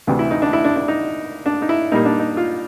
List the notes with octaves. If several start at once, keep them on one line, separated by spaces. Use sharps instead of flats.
D2 C3 E3
E4
D#4
D4
E4
D4
D4
D#4
D4
D#4
E4
A#2 G3 A#3 D#4
D4
D#4
F4